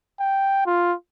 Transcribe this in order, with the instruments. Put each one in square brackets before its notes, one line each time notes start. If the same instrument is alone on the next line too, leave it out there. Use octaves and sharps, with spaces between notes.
[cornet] G5
F4